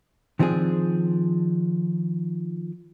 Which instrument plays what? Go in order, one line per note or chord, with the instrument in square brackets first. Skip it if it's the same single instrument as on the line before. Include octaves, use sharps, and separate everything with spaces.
[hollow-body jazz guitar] D#3 F3 C4 D4 G#4